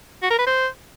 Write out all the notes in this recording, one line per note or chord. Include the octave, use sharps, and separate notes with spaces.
F#4
A#4
B4
C5